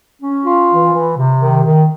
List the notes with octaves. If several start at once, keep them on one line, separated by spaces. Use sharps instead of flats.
C#4
F4
E3
E3
C3
D#3
D#3